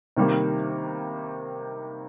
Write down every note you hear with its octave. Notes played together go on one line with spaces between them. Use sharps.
C3 D#3 G3 A#3